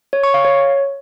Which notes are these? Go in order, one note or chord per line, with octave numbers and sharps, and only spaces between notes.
C#5
C#6
F5
C#5